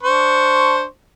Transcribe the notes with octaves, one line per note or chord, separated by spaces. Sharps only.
D4 C5 C#6